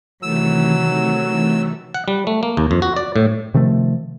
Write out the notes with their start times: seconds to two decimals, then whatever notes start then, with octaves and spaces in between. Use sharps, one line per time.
0.23 C3 D#3 E3 F#3 A3 E6
1.30 E3
1.94 F#5
2.08 G3
2.27 A3
2.43 A#3
2.57 D#2
2.71 F2
2.82 F#4
2.96 D5
3.16 A2
3.54 C3 D#3 F3 A3